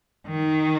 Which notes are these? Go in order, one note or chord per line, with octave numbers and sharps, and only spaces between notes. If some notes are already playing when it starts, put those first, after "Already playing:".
D#3